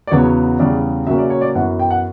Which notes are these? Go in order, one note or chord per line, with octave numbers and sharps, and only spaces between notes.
D5
E2 C#3 F#3 B3 C#5
E2 C#3 G3 D5
C#3 F#3 A#3 C#4 E5
D5
C#5
D5
F#2 E3 B3 F#5
G5
F#5